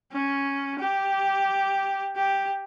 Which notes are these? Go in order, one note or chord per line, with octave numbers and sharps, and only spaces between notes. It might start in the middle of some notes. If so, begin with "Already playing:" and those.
C#4
G4
G4